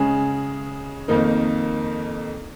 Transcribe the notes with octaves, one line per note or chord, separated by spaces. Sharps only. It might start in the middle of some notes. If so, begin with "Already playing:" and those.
Already playing: C#3 G#3 C#4 G#4
F2 D#3 A#3 D#4 A#4